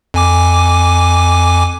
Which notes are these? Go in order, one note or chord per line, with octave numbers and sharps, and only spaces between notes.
F2 G#5 D6